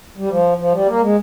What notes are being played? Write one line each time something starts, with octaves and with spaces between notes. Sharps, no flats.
G3
F3
F3
G3
A#3
G#3